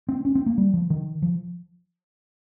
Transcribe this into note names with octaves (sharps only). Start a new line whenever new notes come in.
C4
C#4
C4
A#3
G3
F3
D#3
F3